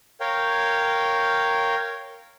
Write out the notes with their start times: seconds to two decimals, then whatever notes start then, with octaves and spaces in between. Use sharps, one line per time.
0.20 A#4 C#5 F5 G5